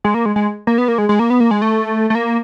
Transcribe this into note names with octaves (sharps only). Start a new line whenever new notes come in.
G#3
A#3
G#3
G#3
A#3
B3
A#3
G#3
G#3
A#3
B3
A#3
G#3
A3
A3
A#3